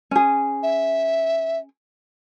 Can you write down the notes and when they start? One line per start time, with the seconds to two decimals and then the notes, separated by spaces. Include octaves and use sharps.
0.11 C#4 G#4
0.63 E5